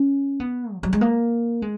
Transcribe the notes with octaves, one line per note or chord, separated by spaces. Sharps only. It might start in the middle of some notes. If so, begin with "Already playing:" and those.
Already playing: C#4
B3
F3
F#3
G#3
A#3
G#3